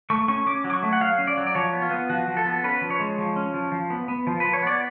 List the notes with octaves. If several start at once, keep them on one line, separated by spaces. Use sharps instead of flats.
A3 C#6
C#4 C#6
C#4 D6
F#3
D6
C#6
A3
F#5
F#3 F5
C#4
D5
F#3
D5
F3 C#5
B3
F4
B3
F3 F#4
F3
A4
B3
C#4 B4
F3
C#5
G#3
F3
C#4
F3
F3
B3
B3
F3
F3 B4
C#5
B3 D5